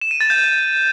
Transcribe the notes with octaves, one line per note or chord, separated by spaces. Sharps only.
E7
D#7
A6
G6